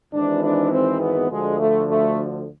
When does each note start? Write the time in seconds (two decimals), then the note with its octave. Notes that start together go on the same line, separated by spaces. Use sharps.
0.14 G#1 G#2 E3 D4
0.43 D4
0.72 C4
1.01 B3
1.30 D2 D3 F3 G#3
1.59 A3
1.88 A3